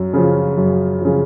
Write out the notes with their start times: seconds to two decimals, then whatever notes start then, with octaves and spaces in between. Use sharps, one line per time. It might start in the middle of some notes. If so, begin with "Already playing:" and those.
Already playing: F#2
0.14 C#3 F3
0.57 F#2
1.01 C#3 F3